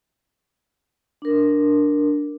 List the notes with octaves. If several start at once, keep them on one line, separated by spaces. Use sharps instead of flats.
D4 A#4